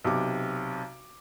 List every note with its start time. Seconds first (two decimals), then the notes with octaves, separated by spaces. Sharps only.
0.04 B1 C3 D6